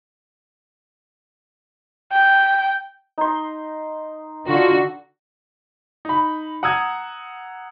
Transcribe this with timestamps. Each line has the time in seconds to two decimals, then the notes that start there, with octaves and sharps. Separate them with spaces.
2.12 G5
3.18 D#4 C6
4.48 D3 F4 F#4
6.05 D#4 B5
6.63 F#5 A#5 D#6 E6 G#6